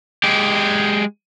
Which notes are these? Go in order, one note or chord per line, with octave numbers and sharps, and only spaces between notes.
G#3 G4